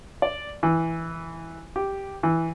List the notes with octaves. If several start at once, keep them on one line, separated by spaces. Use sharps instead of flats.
D5
E3
G4
E3